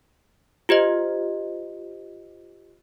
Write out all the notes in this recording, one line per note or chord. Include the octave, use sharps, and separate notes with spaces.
F4 G4 C5 D#5